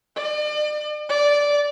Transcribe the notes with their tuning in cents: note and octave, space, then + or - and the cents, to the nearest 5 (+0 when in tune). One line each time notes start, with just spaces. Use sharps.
D5 +40
D5 -10